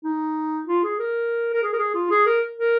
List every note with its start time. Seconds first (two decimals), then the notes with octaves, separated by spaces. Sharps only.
0.04 D#4
0.67 F4
0.84 G#4
0.99 A#4
1.54 A#4
1.63 G#4
1.73 A#4
1.79 G#4
1.94 F4
2.11 G#4
2.27 A#4
2.58 A#4